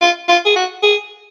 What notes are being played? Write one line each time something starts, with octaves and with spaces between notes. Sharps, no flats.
F4
F4
G#4
F#4
G#4